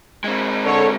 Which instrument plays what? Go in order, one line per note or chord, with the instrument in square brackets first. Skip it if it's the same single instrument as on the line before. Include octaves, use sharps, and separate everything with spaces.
[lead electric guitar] G#3 C4
[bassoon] D3 [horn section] A4 C#5